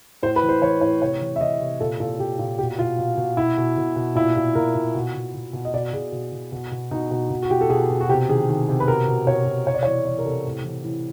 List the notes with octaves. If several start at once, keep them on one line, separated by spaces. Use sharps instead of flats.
A2 C5
B4
E3
C5
E3 C#5
A2 C#5
C3 C#5
E3
E5
E3 D#5
C3
A#2 A4
A#2 A4
A#2 G4
A#2
B2 G4
B2 F4
B2
B2
B2 E4
B2
B2
B2
A#2 E4
A#2
A#2 A#4
A#2
B2
B2
B2
B2
D#5
B2 D5
B2 G#4
B2
B2
B2
B2
B2 D#4
B2
B2
F#4
B2 G4
A4
B2 G#4
B2
F#4
C3 G4
D#3 G#4
D#3
C3
B4
B2 A#4
B2
B2 C#5
B2
C3 C#5
D5
C#5
E3
E3 D5
A#4
C3 A4
A2
E3
E3